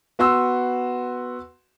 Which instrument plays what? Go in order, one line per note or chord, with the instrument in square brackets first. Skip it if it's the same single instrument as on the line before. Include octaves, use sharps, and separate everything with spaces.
[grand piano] B3 F#4 C6 E6